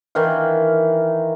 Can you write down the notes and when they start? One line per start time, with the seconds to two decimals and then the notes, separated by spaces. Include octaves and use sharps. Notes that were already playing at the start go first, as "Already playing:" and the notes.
0.15 D#3 E3 F5